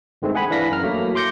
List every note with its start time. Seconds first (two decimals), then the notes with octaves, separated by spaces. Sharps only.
0.22 G2 D#3 G#3 A3 C4
0.35 G#4 F#5 G#5 B5
0.50 E3 D4 F5 A#6 B6
0.71 F#2 A#4 F6
0.83 F#3 A3 A#3
1.15 C6 D6 G6 A#6 C#7